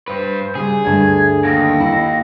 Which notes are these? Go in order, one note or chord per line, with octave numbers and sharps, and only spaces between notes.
G2 B4 C5
C#3 G3 G#4
D2 G2 A3 G#6
D#2 A#6
E4